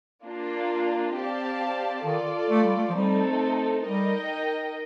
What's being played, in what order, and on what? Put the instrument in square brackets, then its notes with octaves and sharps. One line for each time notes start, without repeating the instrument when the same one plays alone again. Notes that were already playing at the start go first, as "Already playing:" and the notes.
[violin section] A#3 D4 F4
C4 G4 D5 F5 A5
[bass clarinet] D#3 [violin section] F4 A4 D5
[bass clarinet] A3
G3
A3
F3
[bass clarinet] G3 [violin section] A3 C4 D#4 A4
[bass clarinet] G3 [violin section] D#4 A#4 D#5 G5